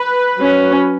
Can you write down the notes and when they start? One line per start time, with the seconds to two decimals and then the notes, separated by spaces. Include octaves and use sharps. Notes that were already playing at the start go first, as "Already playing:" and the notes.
Already playing: B4
0.39 F#3 C#4